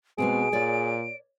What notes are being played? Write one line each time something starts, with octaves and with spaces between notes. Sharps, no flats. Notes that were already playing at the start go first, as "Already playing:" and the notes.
B2 G#3 B3 C4 G#4 D7
A#2 A#4 C#5 D5